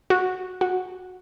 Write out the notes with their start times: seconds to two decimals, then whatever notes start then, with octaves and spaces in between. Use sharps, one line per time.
0.10 F#4
0.61 F#4